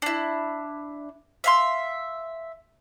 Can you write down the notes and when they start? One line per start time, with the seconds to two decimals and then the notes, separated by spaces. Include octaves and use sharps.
0.02 D4 E4
1.44 E5 F5 C6